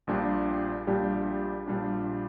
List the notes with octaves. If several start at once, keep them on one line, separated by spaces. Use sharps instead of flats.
A#1 A#2 G3 D4 G4
A#1 A#2 G3 D4 G4
A#1 A#2 G3 D4 G4